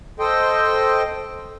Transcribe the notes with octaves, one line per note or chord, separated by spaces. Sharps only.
A4 C5 D#5 G5